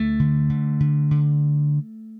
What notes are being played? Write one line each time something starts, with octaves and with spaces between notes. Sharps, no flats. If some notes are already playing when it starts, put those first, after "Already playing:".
Already playing: D2 A3
D3
D3
D3
D3